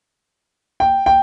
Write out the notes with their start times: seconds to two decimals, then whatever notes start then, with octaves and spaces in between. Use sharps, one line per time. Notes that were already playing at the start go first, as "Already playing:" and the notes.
0.80 G5
1.06 G5